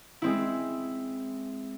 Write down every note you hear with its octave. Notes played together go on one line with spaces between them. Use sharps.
G#3 C4 E4